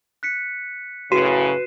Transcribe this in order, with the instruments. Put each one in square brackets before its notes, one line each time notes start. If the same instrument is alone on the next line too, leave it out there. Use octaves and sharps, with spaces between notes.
[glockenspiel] F#6 B6 C#7
[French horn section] F#2 A2 C#3 [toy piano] F#4 [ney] B4 [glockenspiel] C7 D#7 E7